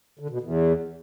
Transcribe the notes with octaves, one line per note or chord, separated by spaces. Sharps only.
D3
B2
E2